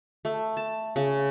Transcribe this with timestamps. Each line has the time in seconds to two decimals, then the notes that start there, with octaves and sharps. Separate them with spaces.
0.25 A3
0.57 A5
0.96 C#3